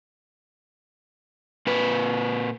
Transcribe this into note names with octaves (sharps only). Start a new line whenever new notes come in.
A#2 B4